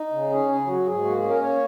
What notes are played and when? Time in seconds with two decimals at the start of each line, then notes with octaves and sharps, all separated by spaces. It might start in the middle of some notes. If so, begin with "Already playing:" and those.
Already playing: D#4
0.12 C#3
0.30 C#4 G#4
0.49 C#3 G#4
0.67 F#3 F#4
0.86 G#2 G#4
1.04 A#3 F#4
1.17 G#4
1.23 C#4
1.29 A#4
1.41 A#3 C#5